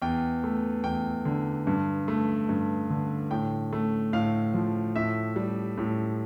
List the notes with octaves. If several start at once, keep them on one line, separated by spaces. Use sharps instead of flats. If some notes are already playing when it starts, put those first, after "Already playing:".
E2 G5
A3
E2 G5
D3
G2
A3
G2
D3
A2 G5
A3
A2 F5
F3
A2 E5
G3
A2